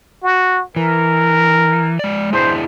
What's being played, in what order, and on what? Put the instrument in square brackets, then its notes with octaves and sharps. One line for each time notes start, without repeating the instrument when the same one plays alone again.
[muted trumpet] F#4
[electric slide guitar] E3 [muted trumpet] A#4
[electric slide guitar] G#3 D5
[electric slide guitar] D4 E4 G#4 [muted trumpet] C5